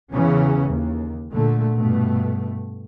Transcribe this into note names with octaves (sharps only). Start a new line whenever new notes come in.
E2 C#3 E3 C#4
D#2
A#2 D3 A3
G2 B2 A3